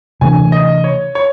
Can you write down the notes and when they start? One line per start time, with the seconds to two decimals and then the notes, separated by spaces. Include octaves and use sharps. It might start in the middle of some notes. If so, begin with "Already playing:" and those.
0.21 C3 E3 A3 D4 G#5
0.52 D#5
0.84 C#5
1.15 C#5